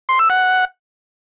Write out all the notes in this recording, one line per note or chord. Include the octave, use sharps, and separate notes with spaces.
C6
E6
F#5